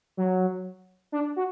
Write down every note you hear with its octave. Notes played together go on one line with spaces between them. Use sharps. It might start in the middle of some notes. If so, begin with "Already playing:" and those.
F#3
D4
F#4